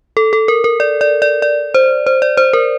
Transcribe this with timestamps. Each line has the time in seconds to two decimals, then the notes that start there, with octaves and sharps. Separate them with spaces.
0.17 A4
0.33 A4
0.48 A#4
0.64 A#4
0.80 D5
1.01 D5
1.22 D5
1.42 D5
1.74 C5
2.07 C5
2.22 D5
2.37 C5
2.53 A#4